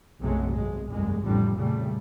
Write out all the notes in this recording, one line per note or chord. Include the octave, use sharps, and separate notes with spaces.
B1 F#2 C3 F#3 G#3 A3
G#1 G#3
F1 C2 G2 G#3
A1 F2 A2 D3 F3 G3
A#2 C#3 G3 A3